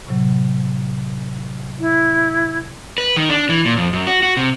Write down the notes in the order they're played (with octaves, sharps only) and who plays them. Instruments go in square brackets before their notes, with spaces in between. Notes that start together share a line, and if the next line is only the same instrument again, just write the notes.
[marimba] A2 C3 F#3
[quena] E4
[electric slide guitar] B4
D#3
D4
E3
A#2
F2
F#2
F#4
F#4
C3